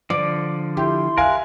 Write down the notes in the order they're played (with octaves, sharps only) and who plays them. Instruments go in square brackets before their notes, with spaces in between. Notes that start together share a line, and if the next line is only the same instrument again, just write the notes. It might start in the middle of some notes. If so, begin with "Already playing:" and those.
[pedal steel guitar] D3 F3 [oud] D5
[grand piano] E4 [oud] G4 [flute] C6
[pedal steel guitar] A#4 F#6 [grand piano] E5 F5 G#5